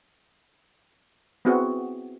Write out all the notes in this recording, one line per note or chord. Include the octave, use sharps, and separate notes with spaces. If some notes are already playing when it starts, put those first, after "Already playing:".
B3 C4 E4 F#4 G#4